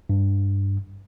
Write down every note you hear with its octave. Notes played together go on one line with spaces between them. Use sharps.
G2